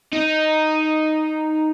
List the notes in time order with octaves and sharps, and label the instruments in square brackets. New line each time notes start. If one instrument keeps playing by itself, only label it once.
[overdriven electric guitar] D#4